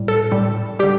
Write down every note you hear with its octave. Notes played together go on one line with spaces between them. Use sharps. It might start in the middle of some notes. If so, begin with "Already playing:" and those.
Already playing: A2 G3
A4
A2 G3
D3 G3 G4